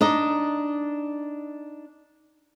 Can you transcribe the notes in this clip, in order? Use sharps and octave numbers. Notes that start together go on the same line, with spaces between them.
D4 D#4 D#5